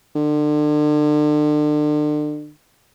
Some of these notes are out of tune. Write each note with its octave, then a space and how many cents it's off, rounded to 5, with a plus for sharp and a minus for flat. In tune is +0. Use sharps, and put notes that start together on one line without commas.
D3 +35